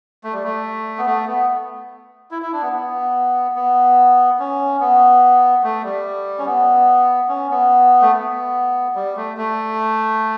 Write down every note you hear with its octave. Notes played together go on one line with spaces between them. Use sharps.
A3
G3
A3
B3
A3
B3
E4
E4
D4
B3
B3
B3
C#4
B3
A3
G3
C#4
B3
C#4
B3
A3
B3
G3
A3
A3